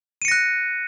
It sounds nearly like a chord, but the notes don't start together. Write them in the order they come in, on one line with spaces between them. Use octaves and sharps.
D#7 C#7 A#6 F#6